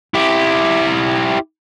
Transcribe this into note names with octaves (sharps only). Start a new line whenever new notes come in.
E4 G4